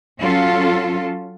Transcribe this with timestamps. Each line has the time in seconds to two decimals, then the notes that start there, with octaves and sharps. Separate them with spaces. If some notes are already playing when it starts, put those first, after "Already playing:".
0.19 F#3 C#4 F4 A4